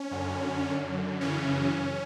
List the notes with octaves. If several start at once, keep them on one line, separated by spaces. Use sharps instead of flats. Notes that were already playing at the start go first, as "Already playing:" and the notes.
Already playing: C#4
F#2 D3
F#2 D3
F#2 C#3 E3 C#4